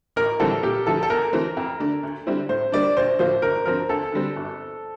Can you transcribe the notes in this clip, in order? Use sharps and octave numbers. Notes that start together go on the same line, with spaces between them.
A1 A#4
A2 E3 G3 C4 A4
A#2 G4
F3 A3 E4 A4
A4
E2 A#4
E3 A3 C4
F2
D3 A3 D4
D2
D3 G3 C4 E4
A2 C5
G3 A#3 D4 D5
A#1 C5
A2 F3 A#3 F4 C5
G1 A#4
G2 F3 C4 A#4
D2 A4
D3 G3 C4
G1